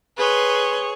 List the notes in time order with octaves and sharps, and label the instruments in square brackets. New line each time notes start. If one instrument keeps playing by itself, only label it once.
[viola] G#4 C#5 [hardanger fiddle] B4 C6